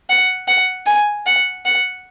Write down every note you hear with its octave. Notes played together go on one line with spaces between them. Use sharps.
F#5
F#5
G#5
F#5
F#5